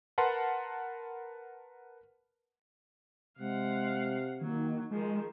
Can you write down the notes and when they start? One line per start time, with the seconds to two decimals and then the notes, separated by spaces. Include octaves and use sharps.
0.18 A#4 B4 F#5 A5 C6
3.39 C3 G#3 F5 F#5
4.41 D#3 F#3 A#3
4.91 D#3 F3 G#3 G#4